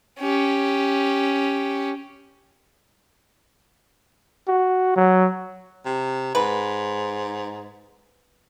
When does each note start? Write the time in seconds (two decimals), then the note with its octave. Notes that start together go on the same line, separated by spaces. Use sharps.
0.19 C#4 G4
4.48 F#4
4.96 F#3
5.85 C3
6.35 G#2 B4